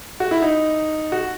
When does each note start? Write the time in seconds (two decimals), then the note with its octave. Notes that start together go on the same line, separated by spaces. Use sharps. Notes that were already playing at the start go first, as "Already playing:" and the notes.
0.20 F#4
0.31 E4
0.42 D#4
1.12 F#4